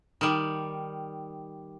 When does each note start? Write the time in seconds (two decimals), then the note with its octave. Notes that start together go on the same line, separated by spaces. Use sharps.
0.21 D#3 G3